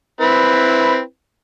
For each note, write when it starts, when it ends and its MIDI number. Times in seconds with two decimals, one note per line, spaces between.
0.21 1.00 60
0.21 1.00 64
0.21 1.00 71